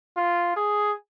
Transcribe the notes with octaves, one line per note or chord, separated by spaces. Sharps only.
F4
G#4